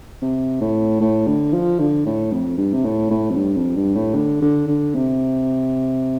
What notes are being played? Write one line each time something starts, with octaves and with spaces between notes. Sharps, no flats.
C3
A2
A2
D3
F3
D3
A2
F2
G2
C3
A2
A2
F2
G2
F2
G2
A2
D3
D3
D3
C3